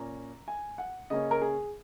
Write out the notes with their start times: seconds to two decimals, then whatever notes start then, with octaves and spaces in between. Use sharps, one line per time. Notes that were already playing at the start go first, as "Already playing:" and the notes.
Already playing: A#2 A#3 C#4 A#5
0.48 G#5
0.78 F#5
1.10 C#3 A#3 C#4 D#5
1.31 A#4
1.42 G#4